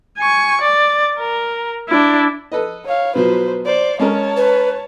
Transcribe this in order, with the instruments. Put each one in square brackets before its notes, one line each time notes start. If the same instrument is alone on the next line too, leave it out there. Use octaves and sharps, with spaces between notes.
[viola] G#5 C#6
D5
A#4
D4 E4
[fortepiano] A4 B4 D#5
[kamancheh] C#5 F5
[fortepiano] B2 F3 F#3 [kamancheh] B4 C5
[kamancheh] C5 D5
[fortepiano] G#3 C#4 A#4 [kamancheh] C#5 A5
[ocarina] B4